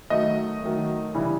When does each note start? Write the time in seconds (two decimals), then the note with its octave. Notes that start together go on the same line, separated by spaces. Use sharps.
0.10 D#3 F#3 A3 D#5
0.63 D#3 F#3 A3
1.14 C#3 E3 G3